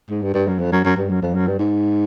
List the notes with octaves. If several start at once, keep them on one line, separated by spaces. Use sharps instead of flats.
G#2
G2
G2
F#2
F2
F#2
F#2
G2
F#2
F2
F#2
G2
G#2